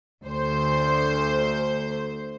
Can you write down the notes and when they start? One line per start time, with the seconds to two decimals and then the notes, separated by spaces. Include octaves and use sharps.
0.24 D2 C5